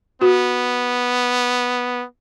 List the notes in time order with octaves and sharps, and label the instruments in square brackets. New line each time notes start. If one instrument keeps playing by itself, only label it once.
[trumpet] B3 [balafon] F#4